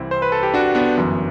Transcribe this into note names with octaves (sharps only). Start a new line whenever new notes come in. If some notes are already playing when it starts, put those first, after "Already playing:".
Already playing: C2 C3 E3 C4 E4
C5
B4
A4
G4
D4 F#4
B3 D4
G1 F#2 E3